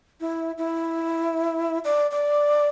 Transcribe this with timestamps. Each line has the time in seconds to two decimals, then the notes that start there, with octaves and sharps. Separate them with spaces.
0.21 E4
0.58 E4
1.85 D5
2.11 D5